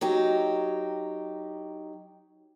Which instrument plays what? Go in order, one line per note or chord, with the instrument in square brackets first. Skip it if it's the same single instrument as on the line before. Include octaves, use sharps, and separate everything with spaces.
[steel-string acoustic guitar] F#3 D#4 G4